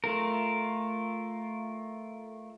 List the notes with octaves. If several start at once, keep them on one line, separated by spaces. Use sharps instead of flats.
A3 F4 A#4